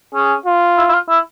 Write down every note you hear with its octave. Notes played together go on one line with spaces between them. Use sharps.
C#4 G#4
F4
E4
E4
F4
E4